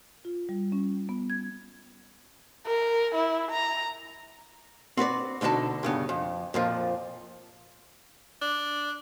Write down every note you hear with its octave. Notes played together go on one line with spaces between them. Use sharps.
F4
G3
C#4
B3
G#6
A#4
E4
A#5
C4 F#4 B4 D5
D2 B2 D3 D#4 A5
G2 C#3 B3
F2
F2 A#2 F3
D4